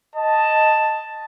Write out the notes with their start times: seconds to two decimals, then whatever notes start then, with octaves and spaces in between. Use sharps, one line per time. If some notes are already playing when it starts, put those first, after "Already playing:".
0.16 D#5 A5